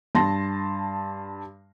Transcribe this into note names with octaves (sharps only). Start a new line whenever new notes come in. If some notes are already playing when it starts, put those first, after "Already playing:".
G2 A5 C6 A#6